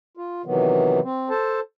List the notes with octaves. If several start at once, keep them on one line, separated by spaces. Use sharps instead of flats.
F4
C3 D#3 E3 F#3 B3
C4
A4 C5 A5